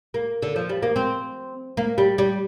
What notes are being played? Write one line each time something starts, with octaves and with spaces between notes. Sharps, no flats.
A#3
D3
F3
G3
A#3
C4
A#3
G3
G3